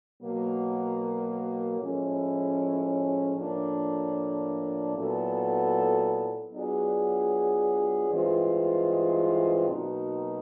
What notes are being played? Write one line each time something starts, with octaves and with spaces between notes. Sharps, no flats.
B2 F#3 A#3
A2 F3 G#3 C#4 E4
A2 F3 A#3 D4
A#2 F#3 B3 E4 A4
F#3 B3 D4 F4 G#4
G2 E3 G#3 C4 F4
B2 F#3 A#3 D#4